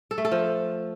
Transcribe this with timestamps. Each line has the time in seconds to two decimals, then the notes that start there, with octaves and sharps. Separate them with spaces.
0.11 A4
0.18 A3
0.25 A4
0.32 F3